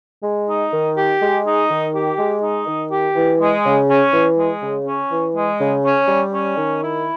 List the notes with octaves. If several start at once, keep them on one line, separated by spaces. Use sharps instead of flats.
G#3
D#4
D#3
G4
G#3
D#4
D#3
G4
G#3
D#4
D#3
G4
E3
G#3
C#3
C#4
E3
G#3
C#3
C#4
E3
G#3
C#3
C#4
G3
C#4
D#3
E4